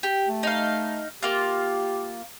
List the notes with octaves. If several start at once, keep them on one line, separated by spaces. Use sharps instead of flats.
G4
A3
D#4 F5
A#3 F4 G4